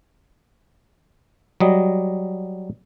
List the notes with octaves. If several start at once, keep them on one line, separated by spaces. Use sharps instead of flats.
F#3 G3 D#5